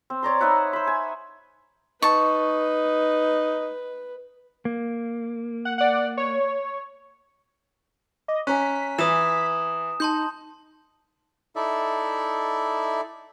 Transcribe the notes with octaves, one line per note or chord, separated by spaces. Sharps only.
C4
C#5 D5 A#5 C6
D#4 B4 E5 F#5
C5 B5
G#5
D#4 B4 A5 C#6
A#3
F#5
D5 F#5
C#5
D#5 D6
C#4 G#5 A#5 F#6 B6
E3 D#6 E7
D#4 A5 C6 G6
D#4 E4 A4 D5 E5